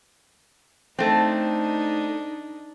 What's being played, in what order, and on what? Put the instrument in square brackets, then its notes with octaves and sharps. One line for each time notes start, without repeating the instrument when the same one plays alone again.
[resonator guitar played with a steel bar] A3 C4 [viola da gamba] D4 D#4